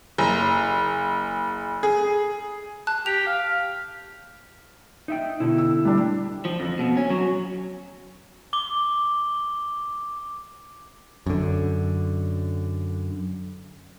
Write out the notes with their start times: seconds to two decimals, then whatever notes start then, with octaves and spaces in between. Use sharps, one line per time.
0.18 F#1
1.83 G#4
2.87 A5 F#6
3.06 G4 F7
3.26 F5
5.08 D#4 E5 G5
5.40 B2 D3 E4
5.58 E6
5.85 G3 D4
6.45 F3
6.60 F2
6.79 B2
6.97 C#4
7.10 F#3
8.53 D6 G7
11.26 F#2 D3